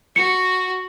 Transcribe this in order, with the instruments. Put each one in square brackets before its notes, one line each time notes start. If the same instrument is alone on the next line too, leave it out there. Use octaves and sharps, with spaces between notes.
[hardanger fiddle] F#4 [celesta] C#7